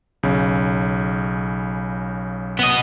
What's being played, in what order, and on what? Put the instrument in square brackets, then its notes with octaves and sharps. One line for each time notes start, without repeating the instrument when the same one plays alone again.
[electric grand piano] B1 C#3
[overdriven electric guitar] B3 D#5